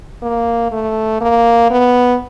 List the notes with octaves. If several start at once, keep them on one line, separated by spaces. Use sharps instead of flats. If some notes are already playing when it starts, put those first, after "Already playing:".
A#3
A3
A#3
B3